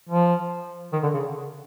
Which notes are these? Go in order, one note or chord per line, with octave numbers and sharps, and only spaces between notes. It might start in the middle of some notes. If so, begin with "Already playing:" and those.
F3
D#3
D3
C#3